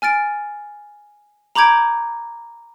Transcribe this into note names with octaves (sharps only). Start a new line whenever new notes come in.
G#5 F6 A6 D7
A#5 B5 D6 G6 G#6 D7